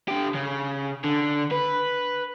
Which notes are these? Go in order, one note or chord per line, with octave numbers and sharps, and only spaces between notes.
D3 G4
C#3
D3
B4